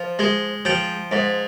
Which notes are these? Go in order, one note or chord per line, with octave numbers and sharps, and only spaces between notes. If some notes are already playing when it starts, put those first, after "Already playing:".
Already playing: F3
G#3
F3 G5
G#2